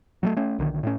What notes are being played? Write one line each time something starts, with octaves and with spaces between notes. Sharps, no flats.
F#3 G3 A3
A3 C#4
B1 D3 D#3
A2 A3 C#4